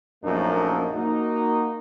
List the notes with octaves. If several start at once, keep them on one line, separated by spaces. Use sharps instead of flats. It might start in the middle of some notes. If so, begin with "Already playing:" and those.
A#1 F#2 F3 A3 A#3 D#4
A#3 D#4 F#4